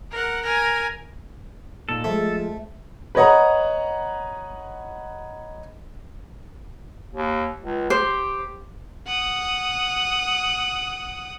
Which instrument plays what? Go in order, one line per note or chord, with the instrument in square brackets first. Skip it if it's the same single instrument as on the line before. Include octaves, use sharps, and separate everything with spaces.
[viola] A#4 F#5
A#4 G#5
[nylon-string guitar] A#2 D#4 [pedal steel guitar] A4
[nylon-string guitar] F3 G#3 [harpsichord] A3
[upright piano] B4 C#5 D#5 F#5 A#5
[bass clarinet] D#2
C#2
[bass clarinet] G4 [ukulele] C5
[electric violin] F#5 D#6